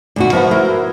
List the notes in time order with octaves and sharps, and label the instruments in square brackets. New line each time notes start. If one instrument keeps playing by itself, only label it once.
[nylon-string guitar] D2 B2 F#4
[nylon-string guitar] F3 E5 F#5 [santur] B3 F#4 A#4
[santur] E4 [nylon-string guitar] A#4 C5